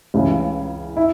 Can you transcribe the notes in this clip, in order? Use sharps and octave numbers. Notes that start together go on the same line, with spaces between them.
C#2 C#3 E3
E4